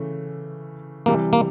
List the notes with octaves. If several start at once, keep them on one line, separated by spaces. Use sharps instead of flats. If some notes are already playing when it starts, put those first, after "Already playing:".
Already playing: C#3 E3 A3
C3 E3 G3 A#3
A#3